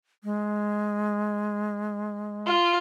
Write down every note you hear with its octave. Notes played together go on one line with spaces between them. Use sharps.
G#3
F4